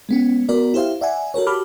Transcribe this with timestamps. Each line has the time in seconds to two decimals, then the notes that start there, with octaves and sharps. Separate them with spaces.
0.09 G#3 B3 C#4
0.49 B3 F#4 A#4 D5
0.74 E4 G4 C5 E5 F5
1.01 D5 E5 F#5 G#5
1.34 F#4 A4 A#4 C#5
1.47 F#4 G4 A5 B5 D6 F6